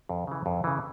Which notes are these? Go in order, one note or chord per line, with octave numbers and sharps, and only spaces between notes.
F2
C#3 E3
F2
C#3 E3